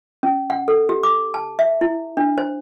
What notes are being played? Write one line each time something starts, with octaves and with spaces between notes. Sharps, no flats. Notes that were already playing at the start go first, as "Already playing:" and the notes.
C#4
F#5
A4
G4
D6
A5
E5
E4
D4
C5